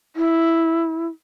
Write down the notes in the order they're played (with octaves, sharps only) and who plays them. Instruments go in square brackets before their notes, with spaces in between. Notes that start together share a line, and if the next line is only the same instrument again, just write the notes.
[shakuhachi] E4